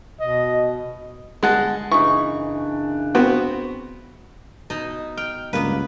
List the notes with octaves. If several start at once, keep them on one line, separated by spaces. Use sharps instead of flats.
B2 D#5
G1 G#3 F#5 A5
F#2 C#3 E3 D4 D#4 C#6
B3 C4 F#4
B2 D#4
G5 F6
C#2 G2 A#3 B3 B4